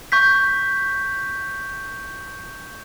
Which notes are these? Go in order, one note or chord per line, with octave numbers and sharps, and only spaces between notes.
C#6 G6 B6